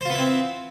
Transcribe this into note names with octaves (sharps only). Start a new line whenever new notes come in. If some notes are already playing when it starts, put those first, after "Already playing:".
B3 C4 E4 F4 C5